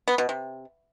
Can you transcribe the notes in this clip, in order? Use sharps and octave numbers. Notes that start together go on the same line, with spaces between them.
B3
B2
C3